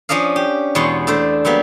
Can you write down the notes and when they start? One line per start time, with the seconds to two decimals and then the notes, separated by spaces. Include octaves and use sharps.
0.09 F3 C#4 D4 D#5 F5
0.36 G4
0.75 E2 B2 G#3 C#5 C6
1.07 A3 D4 C5
1.45 F#3 G3 A#3 B3